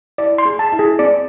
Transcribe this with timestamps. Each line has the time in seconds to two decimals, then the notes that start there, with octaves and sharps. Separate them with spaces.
0.18 E4 D5
0.38 C6
0.45 G#4
0.59 A5
0.72 E4
0.79 G#4
0.99 C4 D5